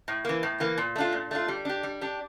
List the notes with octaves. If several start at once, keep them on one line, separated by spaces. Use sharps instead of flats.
A2
E3 A#3
A2
E3 A#3
A#2
A3 D4 F4
A#2
A3 D4 F4
G3
D4 G4
G3
D4 G4